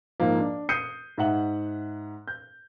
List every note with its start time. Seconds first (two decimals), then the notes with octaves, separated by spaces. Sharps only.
0.20 G#2 F3 A#3
0.39 D4
0.69 D#6 G6 C7 C#7 D#7
1.18 G#2 E5 F#5 F#7
2.28 G6